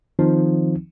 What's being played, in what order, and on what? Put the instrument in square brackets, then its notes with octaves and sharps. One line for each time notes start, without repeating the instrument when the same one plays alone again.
[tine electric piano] D#3 F3 C4 D#4